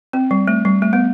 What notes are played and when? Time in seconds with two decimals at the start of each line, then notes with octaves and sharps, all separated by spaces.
0.13 C4
0.31 G3
0.48 A3
0.65 G3
0.82 A3
0.93 B3